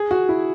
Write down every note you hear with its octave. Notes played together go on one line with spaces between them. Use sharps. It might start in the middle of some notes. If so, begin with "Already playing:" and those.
Already playing: G#4
F#4
E4